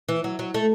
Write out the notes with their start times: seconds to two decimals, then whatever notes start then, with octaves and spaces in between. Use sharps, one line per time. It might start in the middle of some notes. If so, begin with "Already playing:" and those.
0.09 E3
0.24 F#3
0.39 F#3
0.54 A3